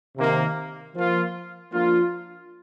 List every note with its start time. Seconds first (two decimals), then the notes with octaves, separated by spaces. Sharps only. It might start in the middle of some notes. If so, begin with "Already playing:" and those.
0.17 C3 D#3 A#3
0.95 F3 A#3 F4
1.72 F3 A#3 D4 F4